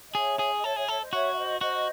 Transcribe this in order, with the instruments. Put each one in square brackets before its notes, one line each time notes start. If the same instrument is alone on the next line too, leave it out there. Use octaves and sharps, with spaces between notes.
[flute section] D#5
[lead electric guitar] G#4 [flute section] C#5 E5
[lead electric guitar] G#4
[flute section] D#5
[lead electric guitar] A4 [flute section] C#5 E5
[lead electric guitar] G#4 [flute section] C#5 E5
[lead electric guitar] A4 [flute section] C#5 E5
[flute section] C5 D#5
[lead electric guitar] F#4 [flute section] C#5 E5
[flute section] E5
C5 D#5
[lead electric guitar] F#4 [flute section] C5 D#5